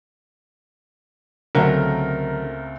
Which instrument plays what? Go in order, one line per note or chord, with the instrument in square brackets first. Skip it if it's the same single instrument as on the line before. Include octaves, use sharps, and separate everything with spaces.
[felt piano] C#2 A3 C4 [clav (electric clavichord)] D3 F#3 F#5 [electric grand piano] A#4